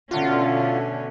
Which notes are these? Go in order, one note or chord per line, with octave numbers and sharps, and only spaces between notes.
B2 D3 A3 C#4 F4 F#4